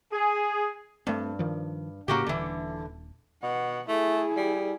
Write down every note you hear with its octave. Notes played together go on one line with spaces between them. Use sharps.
G#4
G2 A3 C4
D#3 F3
A2 C#3 A#3 F#4 G4
D#1 D3 E3 D4
B2 F#5
A3 E4 G#4
G3